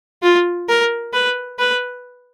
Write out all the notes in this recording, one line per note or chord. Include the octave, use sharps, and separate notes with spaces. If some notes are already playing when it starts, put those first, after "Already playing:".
F4
A#4
B4
B4